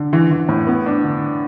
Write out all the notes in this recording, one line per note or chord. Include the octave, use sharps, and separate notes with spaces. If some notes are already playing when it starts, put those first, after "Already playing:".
Already playing: D3
E3
E3
A2
B3
D4
D3